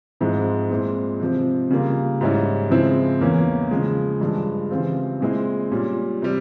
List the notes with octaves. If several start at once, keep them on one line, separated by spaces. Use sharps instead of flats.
G#2 F3 G#3 C4 E4
A#2 G#3 C4 E4
C3 F3 C4
C#3 G3 A#3 F4
G#2 G3 C#4 E4
C#3 F3 G#3 C4 E4
E2 E3 A#3 C#4
C#3 F3 G#3
G2 F3 G#3
C#3 E3 G3 C4 F4
A#2 G#3 C4 E4
A#2 G3 C#4
C3 G3